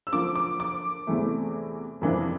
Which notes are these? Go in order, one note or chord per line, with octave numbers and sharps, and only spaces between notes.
E6
D3 F3 A#3 D6
D6
D6
E2 C3 E3 A3
F2 C3 E3 A#3 D4